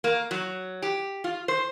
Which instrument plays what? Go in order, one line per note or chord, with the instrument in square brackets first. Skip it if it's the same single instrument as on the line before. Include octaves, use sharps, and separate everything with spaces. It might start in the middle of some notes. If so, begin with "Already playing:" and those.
[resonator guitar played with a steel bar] A#3
F#3
G4
F4
C5